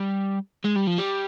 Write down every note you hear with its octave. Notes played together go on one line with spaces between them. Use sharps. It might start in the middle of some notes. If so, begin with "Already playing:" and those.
Already playing: G3
G#3
G3
F3
G3